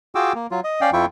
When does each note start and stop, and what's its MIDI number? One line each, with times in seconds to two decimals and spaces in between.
0.15 0.33 65
0.15 0.33 66
0.15 0.33 68
0.15 0.33 79
0.15 0.33 86
0.15 0.33 88
0.35 0.47 58
0.51 0.60 54
0.51 0.60 65
0.64 0.81 75
0.81 0.90 61
0.81 0.90 74
0.81 0.90 77
0.81 0.90 79
0.93 1.06 41
0.93 1.06 53
0.93 1.06 64
0.93 1.06 65
0.93 1.06 79
0.93 1.06 85